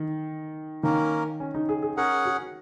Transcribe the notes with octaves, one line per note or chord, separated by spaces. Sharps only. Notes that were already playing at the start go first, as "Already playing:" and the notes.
Already playing: D#3
D#3 A#3 C#4 A#4
C#4
D#4
G#4
G#4
C#4 G#4 A#4 F#5
F#4